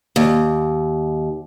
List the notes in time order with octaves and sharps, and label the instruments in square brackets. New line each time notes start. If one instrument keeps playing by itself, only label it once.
[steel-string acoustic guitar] D#2